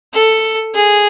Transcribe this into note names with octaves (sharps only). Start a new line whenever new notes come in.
A4
G#4